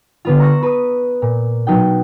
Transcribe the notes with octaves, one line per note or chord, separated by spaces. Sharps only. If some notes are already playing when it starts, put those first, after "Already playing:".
D3 B3 F4
A#5 C6 C#6 E6 F#6 A#6
B4 A#5 D#6
A#2
B2 F#3 D#4 G5